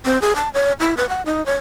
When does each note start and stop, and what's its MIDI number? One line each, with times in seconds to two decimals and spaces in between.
0.06 0.20 60
0.22 0.35 68
0.36 0.49 81
0.54 0.72 73
0.80 0.96 64
0.97 1.08 71
1.09 1.22 78
1.26 1.44 63
1.46 1.55 73